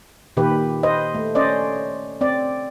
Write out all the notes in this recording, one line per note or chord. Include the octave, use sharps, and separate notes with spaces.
A#2 D#3 G4 B4
B4 C5 D#5
A3
C#4 C5 D5 D#5
C4 D5